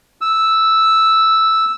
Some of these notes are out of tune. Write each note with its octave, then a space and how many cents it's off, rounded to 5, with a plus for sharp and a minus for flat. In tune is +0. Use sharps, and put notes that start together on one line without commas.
E6 -5